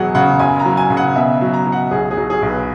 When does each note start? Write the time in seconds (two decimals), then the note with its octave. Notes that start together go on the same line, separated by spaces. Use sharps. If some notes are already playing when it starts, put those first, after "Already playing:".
Already playing: E1 F#3 G#4 F#5
0.15 C#3 F#5
0.39 F#1 G#5
0.59 A#5
0.65 F#3
0.77 G#5
0.90 C#3
0.97 F#5
1.15 B2 E5
1.41 F#3
1.53 A#5
1.66 F#3
1.72 F#5
1.91 B1 G#4
2.11 G#4
2.17 F#3
2.30 G#4
2.42 B1
2.49 B4